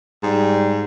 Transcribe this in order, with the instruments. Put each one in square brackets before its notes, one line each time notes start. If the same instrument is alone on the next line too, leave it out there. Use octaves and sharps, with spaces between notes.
[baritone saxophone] G#2 [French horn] G3